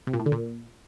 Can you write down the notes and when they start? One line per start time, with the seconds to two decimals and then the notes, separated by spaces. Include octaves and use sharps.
0.07 C3
0.13 A#2
0.20 A2
0.26 D3
0.32 A#2